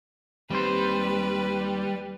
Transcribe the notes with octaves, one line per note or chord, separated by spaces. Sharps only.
D#2 G3 C4 B4 C5